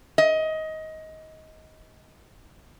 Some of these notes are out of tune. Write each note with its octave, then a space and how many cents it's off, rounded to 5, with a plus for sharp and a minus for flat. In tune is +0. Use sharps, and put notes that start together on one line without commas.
D#5 +20